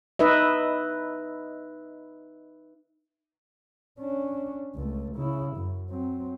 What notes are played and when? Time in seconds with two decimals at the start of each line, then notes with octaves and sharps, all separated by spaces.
0.19 D#4 B4 D#5 E5
3.99 C#4 D4
4.75 C#2 A3
5.16 C#3 E4
5.57 F#2
5.90 F#3 C4